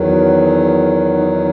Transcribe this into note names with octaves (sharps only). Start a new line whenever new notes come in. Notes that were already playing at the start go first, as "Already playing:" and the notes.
Already playing: E2 D#3 F#3
D#4